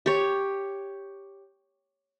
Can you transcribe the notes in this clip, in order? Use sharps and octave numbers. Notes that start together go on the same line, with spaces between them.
G4 C#5